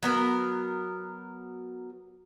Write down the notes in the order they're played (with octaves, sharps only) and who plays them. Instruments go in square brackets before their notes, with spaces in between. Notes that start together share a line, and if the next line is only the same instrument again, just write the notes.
[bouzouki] F#3 B3 A#4